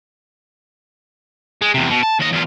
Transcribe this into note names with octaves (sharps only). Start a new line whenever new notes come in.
G#3
E2 C3
B2
A5
D#2 D#5
E2 F4